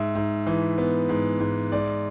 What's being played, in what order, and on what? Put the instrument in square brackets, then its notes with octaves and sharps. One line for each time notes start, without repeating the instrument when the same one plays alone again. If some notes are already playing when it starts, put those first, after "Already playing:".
Already playing: [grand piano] G#2 E5
G#2
E3
B3
G#2
G#2
G#2 D5